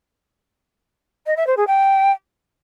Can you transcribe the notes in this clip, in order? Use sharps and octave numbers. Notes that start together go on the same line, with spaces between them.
D#5
E5
C5
G#4
G5